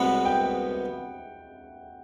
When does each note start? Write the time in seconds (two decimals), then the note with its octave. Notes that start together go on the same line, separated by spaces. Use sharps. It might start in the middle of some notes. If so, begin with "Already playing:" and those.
Already playing: C2 B2 G#3 B3 F#5
0.25 G5